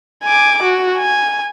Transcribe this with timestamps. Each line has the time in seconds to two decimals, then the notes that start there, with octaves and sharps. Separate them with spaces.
0.23 G#5 D6
0.62 F#4
0.97 G#5